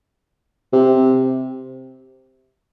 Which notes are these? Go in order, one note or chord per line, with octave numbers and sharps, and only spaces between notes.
C3